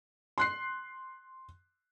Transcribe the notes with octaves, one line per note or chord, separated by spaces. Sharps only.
C6 F#6 C7